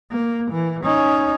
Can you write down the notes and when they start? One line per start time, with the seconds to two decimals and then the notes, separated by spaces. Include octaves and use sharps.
0.11 A#3
0.51 E3
0.84 C#4 D#4